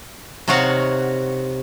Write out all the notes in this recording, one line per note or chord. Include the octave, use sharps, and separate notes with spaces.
C3 D#4 F#4 C#5 F5 F#5